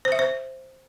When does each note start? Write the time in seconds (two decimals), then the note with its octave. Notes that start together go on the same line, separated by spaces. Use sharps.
0.05 C5
0.12 E5
0.19 C5